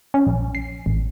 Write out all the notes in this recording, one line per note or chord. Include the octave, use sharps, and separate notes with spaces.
C#4
A#1
C7
A1